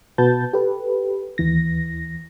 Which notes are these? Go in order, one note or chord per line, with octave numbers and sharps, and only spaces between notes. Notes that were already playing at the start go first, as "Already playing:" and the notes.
B2 F#4 B4 A5 G6 A6
G4 A4 B4
D#2 E3 A#6